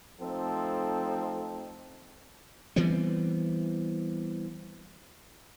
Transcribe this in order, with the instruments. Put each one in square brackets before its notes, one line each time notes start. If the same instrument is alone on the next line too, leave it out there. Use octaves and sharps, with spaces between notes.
[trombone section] F3 A3 C4 D#4 A4
[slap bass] E3 G3 B3 C4